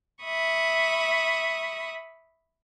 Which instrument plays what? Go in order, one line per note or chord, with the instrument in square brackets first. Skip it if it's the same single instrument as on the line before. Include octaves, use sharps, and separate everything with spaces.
[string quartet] E5 B5 C#6 D#6